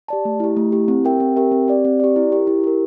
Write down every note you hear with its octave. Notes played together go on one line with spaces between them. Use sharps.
G4 D5 A5
A3
E4 G4
A3
E4 G4
C4
G4 A#4 E5 G5
C4
G4 A#4 E5 G5
C4
G4 D5
C4
G4 D5
E4
G4 A#4
E4
G4 A#4